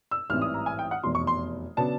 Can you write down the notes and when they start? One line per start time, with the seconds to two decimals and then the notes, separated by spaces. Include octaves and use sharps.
0.11 E6
0.30 A1 G#2 E3 G3 C4 F6
0.42 D#6
0.54 A#5
0.66 G#5
0.79 G5
0.91 F#5
1.03 F1 E2 B2 F#3 C6
1.15 C#6
1.27 C6
1.77 C#3 F#3 B3 D4 A5